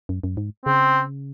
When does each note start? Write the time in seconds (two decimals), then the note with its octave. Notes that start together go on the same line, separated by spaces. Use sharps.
0.09 F#2
0.24 F#2
0.37 G#2
0.66 C#3 C4